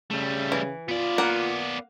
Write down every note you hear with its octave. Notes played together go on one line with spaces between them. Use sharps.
C#3 G3 A3
E3
B3 F4 D5
A#3 F#5